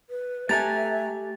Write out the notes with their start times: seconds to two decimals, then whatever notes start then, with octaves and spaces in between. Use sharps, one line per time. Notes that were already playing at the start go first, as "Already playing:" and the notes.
0.10 B4
0.49 A3 G4 A4 E5 G#5 A#5 F#6 A6